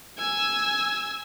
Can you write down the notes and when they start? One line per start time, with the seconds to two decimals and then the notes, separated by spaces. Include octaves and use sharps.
0.19 G#5 E6